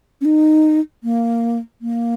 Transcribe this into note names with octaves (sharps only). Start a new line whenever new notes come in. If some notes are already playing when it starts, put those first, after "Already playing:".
C#4
D#4
A#3
A#3